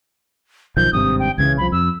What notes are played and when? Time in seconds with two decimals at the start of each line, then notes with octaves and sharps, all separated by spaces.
0.77 B1 D#3 F3 G6
0.93 G#1 G2 C3 D#6
1.19 G5
1.38 C#2 C#3 E3 G#6
1.58 C2 F3 B5
1.72 F2 E6